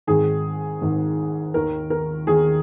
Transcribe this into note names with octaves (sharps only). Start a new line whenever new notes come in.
G#1 G#2 D#3 G#4
G#1 G#2 D#3
D#2 D#3 A#4
A#4
D#2 D#3 G#4